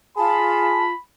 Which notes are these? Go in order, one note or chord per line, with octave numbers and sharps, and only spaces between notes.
F4 G#4 A5 B5